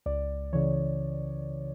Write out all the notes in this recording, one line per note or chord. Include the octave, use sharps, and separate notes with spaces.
C#2 D5
C#3 E3 C#5